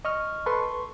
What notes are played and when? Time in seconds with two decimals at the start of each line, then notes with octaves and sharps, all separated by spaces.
0.05 D#5 C#6 F6
0.46 A4 B4 C6 C#6